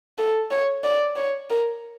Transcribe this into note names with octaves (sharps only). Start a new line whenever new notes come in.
A4
C#5
D5
C#5
A#4